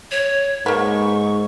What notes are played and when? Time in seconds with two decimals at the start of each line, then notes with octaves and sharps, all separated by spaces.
0.11 C#5
0.66 G#2 A#3 B3 C#6